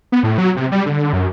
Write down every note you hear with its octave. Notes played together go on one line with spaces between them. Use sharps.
B3
A2
F#3
C3
G3
D3
F#2